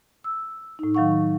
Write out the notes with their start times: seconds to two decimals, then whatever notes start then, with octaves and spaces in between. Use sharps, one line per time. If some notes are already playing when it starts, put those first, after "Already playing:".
0.24 E6
0.79 A2 D#4
0.95 D#3 F#3 F5 F#5 C#6